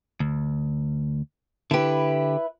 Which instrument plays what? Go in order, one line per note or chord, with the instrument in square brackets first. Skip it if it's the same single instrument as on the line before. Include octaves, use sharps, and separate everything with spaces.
[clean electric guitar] D2
[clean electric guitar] D3 G4 [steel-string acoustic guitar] E4 B4